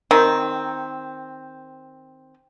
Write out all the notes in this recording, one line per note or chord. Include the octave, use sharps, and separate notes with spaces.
D#3 C4